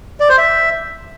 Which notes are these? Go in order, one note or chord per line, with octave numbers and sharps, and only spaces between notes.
D5
C5
E5